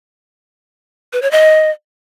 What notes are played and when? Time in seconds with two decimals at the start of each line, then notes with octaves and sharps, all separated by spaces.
1.13 B4
1.22 C#5
1.31 D#5